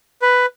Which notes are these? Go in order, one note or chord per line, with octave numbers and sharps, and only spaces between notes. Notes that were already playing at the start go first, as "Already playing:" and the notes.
B4